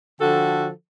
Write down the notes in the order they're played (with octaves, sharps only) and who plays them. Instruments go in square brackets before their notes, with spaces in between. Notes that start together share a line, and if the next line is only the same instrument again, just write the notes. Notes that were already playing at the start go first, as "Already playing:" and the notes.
[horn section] D3 F3 F#4 A4 G5